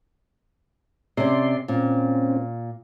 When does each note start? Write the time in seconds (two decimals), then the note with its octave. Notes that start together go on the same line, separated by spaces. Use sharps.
1.17 C3 C#4 D5 C6
1.68 A#2 C4 C#4